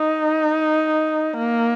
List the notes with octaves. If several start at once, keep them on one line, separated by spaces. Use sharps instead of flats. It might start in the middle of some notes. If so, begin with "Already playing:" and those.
Already playing: D#4
A#3